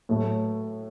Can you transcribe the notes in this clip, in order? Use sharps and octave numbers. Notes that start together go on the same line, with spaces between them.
A2 F#3 A3